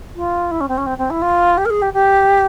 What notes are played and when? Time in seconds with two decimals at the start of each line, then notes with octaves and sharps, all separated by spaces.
0.16 F4
0.51 E4
0.60 C#4
0.68 C4
0.77 C#4
0.86 C4
0.98 C4
1.10 E4
1.21 F4
1.57 G4
1.65 A#4
1.70 G#4
1.82 G4
1.93 G4